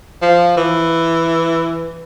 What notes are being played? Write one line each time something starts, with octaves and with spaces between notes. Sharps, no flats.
F3
E3